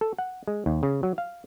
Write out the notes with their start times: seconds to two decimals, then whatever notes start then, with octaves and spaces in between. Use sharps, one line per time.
0.01 A4
0.18 F#5
0.48 G#3
0.66 D#2
0.83 C#3
1.03 F#3
1.18 F5